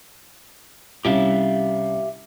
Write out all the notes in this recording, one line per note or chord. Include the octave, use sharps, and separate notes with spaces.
C2 C#4 G4 E5 F5